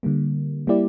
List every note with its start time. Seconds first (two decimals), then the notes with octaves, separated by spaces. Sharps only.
0.03 D3 G3 A#3
0.67 G3 A#3 E4 G4 D5